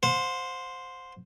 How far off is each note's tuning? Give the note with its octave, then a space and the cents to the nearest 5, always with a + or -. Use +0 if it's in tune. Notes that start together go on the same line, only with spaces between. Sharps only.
C5 +0 F#5 -45